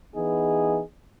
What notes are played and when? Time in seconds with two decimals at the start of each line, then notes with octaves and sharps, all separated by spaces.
0.15 E3 B3 D#4 G#4